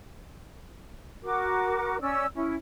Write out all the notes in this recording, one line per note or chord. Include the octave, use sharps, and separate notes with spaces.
F#4 A#4 D6
C#4 D5 E6
C#4 E4